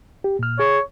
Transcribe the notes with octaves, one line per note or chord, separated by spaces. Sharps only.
G4
A#2 F6
G#4 C#5